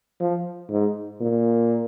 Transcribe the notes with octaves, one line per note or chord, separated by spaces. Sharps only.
F3
G#2
A#2